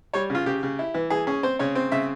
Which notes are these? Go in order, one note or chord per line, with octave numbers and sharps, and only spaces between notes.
G3 C#5
C#3 F4
C#3 G4
C#3
E4
E3
E3 G#4
C#4 G#4
C4 C5
C#3 C#5
C4
C#3 E5